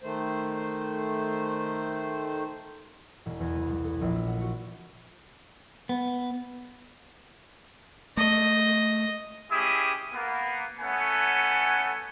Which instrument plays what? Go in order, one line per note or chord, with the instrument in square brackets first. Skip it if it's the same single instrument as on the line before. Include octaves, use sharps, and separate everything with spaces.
[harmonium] D#3 A3 C5
[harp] E1
E2
C2
G3
A4
A#1
E6
F#5
F#4
[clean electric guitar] B3
[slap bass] A3 [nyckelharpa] D#5
[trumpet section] C#4 E4 G4 G#4 D#5 D#6
A#3 B3
A3 B3 C#4 A4 F#5 G#5